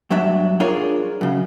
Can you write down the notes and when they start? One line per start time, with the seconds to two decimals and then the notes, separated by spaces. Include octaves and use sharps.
0.10 G2 F#3 D4 E5
0.60 D4 F4 G#4 A#4 C#5
1.21 F#2 C#3